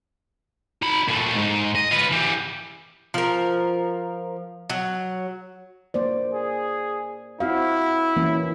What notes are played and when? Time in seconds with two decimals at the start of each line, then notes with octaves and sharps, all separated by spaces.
0.82 D#4 B5
1.08 A#2 A3
1.35 G#2
1.75 D#5
1.91 F4 B4
2.11 E3 G3
3.14 F3 A#4
4.70 F#3
5.94 A#3 C5 D5
6.33 G#4
7.40 C4 E4 F#4 F5
8.16 E3 A#3 C#4